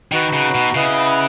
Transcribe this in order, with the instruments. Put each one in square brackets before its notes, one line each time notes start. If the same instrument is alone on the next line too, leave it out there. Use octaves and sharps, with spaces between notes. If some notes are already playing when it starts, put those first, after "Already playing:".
[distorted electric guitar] D#3 [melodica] D#4 F#4 B4 F#5
[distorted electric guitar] C#3
B2
[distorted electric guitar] C#3 [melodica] E4 B4 D#5 F#5